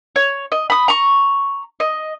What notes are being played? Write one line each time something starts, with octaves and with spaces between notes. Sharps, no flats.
C#5
D#5
B5 D#6
A#5 C#6
D#5